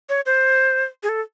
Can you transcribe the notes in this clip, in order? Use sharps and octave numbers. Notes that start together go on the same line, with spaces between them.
C#5
C5
G#4
A4